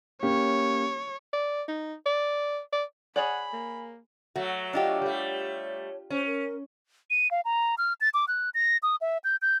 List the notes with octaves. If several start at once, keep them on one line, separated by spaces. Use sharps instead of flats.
A#3 C#4 G4 C#5
D5
D#4
D5
D5
G#4 C#5 D5 F#5 G#5 B5 F#7
A#3
F#3 A3 F#4
D4 F4 G4 D#5
G3 A3 C#5
C#4 C5
A#4
D#7
F5
A#5
F6
A6
D6
F#6
A#6
D#6
E5
G6
G6